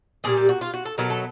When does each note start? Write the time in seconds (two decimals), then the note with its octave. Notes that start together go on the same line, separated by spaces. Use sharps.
0.24 A#2 G3 G#4
0.37 G4
0.49 F#4
0.61 F4
0.74 F#4
0.86 A4
0.98 B2 F#3 A3 A#4
1.10 A4